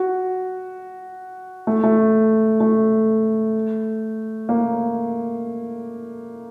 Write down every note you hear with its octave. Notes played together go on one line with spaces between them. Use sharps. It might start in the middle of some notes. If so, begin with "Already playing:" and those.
Already playing: F#4
A3
A3
A3
A#3